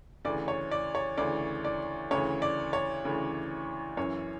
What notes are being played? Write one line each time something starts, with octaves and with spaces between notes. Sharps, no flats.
D2 C#3 E3 D5
C#5
D5
C#5
D2 C#3 E3 D5
D5
D2 C#3 E3 C#5
D5
C#5
D2 C#3 E3
F#2 E3 C#5